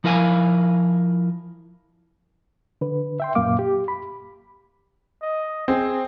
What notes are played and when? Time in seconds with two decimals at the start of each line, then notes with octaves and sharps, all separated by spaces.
0.04 F3 E4 A#4 F5 G#5
2.81 D3 B4
3.20 E5 G5 C6
3.35 F#2 A#2 A#3 F5 D6
3.59 G4
3.88 B5
5.22 D#5
5.68 C4 G#4